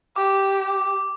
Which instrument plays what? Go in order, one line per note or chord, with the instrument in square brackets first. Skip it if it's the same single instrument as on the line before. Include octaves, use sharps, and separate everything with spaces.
[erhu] G4 [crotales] D6